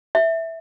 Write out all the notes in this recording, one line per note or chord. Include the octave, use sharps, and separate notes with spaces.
E5